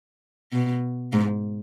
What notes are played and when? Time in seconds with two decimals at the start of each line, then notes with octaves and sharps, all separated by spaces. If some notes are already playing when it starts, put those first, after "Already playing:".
0.52 B2
1.13 G#2